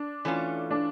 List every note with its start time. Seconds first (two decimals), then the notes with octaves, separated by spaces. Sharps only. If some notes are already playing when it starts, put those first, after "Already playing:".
Already playing: D4
0.25 E3 A3 C#4 F4
0.70 D4